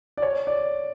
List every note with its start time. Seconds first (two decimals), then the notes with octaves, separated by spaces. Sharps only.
0.17 D5
0.22 C#5
0.47 D5